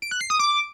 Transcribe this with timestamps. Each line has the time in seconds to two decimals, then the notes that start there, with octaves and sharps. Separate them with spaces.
0.02 D7
0.11 F#6
0.21 C7
0.30 D#6
0.39 D6